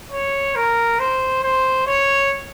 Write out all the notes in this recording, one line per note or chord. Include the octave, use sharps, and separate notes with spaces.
C#5
A#4
C5
C5
C#5